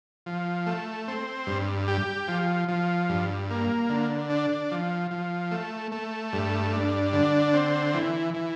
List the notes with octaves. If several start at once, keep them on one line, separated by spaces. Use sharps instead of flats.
F3
A3
C4
G2
G4
F3
F3
G2
A#3
D3
D4
F3
F3
A3
A3
G2
D4
D3
C4
E3
E3